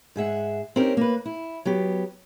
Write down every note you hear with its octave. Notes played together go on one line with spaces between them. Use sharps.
G#2 G#4 E5 F#5
C4 C#4 D#4 G4 A#4
A#3 B4
E4
F#3 B3 G4